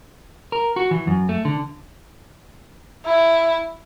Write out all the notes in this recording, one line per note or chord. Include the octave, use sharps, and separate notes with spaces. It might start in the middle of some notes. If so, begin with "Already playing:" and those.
A#4
F#4
E3
F#2
A3
D3
E4